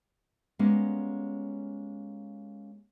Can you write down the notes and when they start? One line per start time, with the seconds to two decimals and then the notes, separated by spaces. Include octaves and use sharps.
0.59 G3 G#3 A#3 B3 C#4